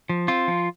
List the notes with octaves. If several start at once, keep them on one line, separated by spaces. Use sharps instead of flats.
F3
C4 F4
F3